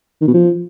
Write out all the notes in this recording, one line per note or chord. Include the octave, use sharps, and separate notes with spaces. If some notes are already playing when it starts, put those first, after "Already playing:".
D#3
B2
F3